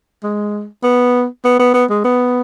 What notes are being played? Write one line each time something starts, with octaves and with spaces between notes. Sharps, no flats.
G#3
B3
B3
B3
B3
G#3
B3